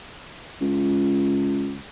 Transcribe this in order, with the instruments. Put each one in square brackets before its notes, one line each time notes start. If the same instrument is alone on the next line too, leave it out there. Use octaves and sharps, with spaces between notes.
[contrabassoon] C#2